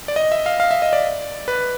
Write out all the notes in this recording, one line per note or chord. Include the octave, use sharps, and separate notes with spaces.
D5
D#5
E5
F5
F5
E5
D#5
D5
B4